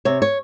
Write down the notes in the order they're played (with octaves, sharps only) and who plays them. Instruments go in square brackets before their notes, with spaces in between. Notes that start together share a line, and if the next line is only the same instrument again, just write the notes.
[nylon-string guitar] C3 C#5
C#5